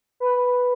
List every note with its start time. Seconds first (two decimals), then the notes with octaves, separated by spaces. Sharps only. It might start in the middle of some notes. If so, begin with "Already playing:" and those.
0.20 B4